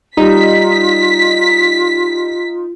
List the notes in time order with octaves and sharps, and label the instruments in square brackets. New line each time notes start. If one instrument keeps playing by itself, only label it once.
[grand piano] G3 [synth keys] D#4 [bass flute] F4 [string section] B6